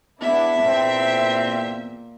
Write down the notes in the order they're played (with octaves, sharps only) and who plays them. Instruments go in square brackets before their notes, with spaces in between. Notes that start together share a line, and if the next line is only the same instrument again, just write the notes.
[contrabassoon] E2 [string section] B3 D4 E4 [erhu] E5
[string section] A#2 [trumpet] C4